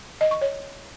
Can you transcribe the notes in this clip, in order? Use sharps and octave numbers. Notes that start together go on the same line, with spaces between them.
D#5
C#6
C#5